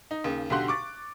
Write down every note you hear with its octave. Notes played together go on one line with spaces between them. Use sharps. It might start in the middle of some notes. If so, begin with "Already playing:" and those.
D#4
D#2 C#3
B1 D3 F#4 G4 C6 F#6
C#6 D6 A6